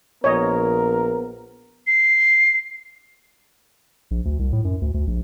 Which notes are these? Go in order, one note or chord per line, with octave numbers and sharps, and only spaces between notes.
A#1 B3 A#4 C#5 D#5
C7
A#1
D2
C2
A2
F#2
D2
D2
A#1